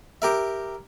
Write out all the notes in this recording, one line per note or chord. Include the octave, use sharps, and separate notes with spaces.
G4 A#4 E5